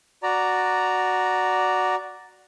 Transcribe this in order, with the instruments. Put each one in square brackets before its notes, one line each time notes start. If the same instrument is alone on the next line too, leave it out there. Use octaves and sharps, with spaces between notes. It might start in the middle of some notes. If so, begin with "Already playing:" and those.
[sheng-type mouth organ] F#4 D5 A#5